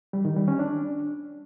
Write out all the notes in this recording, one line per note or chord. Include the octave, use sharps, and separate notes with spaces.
G3
D#3
G3
C#4
D4